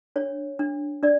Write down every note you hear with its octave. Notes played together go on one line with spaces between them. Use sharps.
D4 C#5
D4
D4 D5